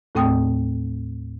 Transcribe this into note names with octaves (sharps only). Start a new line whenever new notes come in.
D#2 A2 A3 C4 G5 D#6